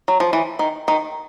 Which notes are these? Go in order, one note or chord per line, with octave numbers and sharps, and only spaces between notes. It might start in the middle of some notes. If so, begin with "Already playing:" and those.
F#3
F3
E3
D#3
D#3